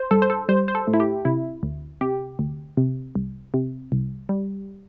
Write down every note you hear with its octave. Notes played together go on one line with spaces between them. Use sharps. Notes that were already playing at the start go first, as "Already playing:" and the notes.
Already playing: C5
G2 A4
C5
A4
G3 C5
C5
A4
A2
E4
G4
C3 E4
D2
C3 G4
D2
C3
C2
C3
C2
G3